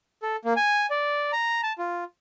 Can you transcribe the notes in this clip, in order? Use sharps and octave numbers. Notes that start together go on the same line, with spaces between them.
A4
A#3
G#5
D5
A#5
A5
F4